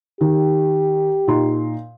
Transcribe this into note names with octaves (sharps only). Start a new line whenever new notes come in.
D#3 G4
A#2 D#4 C6